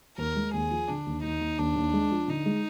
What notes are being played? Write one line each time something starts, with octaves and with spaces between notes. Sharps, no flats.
D#2 A#4
G#3
D#2 G#4
F3
D3 D4
D#2
D#2 D#4
D#2
D#2 D4
D#2
G#3
F3
D3 D#4
G#3